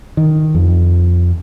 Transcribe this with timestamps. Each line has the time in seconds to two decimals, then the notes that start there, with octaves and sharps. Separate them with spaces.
0.17 D#3
0.55 F2